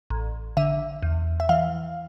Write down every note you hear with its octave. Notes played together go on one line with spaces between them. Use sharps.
A1
D3 E5
E2
E5
E3 F5